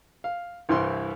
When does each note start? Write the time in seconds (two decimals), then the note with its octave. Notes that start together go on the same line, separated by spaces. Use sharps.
0.24 F5
0.69 C2 G2 E3 C4 E4 C6